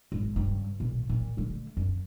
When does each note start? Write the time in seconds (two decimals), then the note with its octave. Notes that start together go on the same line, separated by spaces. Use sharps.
0.12 G#1
0.36 G2 C#3
0.80 B1 A#2
1.09 A#2
1.37 D3 A3
1.77 F#2